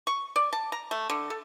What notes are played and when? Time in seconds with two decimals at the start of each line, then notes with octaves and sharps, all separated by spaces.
0.07 C#6
0.36 D5
0.53 A5
0.72 A#5
0.91 A3
1.10 D3
1.30 A4